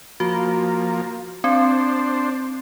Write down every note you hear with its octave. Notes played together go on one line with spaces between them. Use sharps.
F3 A#3 F#4
C4 D4 C5